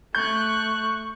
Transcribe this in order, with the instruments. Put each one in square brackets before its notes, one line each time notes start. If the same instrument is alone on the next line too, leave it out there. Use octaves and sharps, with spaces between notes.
[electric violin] A3 F#6 [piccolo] C#6 [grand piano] G6